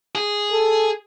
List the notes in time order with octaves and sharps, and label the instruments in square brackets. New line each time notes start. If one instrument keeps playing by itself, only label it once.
[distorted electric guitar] G#4
[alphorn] A4